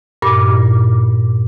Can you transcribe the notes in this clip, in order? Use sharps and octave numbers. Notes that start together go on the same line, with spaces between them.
G2 A#2 D6